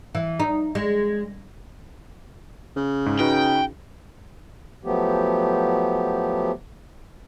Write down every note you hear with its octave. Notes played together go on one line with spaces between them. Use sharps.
E3
D#4
G#3
C#3
G#2
D#4 F#4 B4 G5
F3 F#3 A3 B3 G4